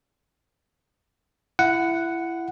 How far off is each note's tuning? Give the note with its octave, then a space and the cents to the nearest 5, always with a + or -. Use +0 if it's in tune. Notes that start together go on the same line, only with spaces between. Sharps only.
E4 +25 F#5 +0